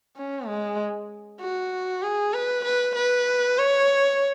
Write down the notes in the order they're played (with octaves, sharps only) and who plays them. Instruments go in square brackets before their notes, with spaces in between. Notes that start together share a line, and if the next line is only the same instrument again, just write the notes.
[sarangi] C#4
G#3
F#4
G#4
B4
B4
B4
C#5